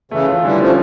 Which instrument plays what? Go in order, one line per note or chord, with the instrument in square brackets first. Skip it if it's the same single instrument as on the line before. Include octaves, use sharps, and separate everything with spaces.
[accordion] C#3 E3 [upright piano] A3
[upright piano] F4
[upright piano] D3 [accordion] E3 G3
[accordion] F3 A3 [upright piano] C#4